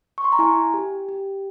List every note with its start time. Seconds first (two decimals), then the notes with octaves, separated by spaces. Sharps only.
0.18 C#6
0.24 C6
0.32 A#5
0.39 E4 G#5
0.74 G4
1.09 G4